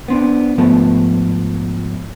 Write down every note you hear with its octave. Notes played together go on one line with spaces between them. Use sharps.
B3 C4 D4
G#2 F3 A3 B3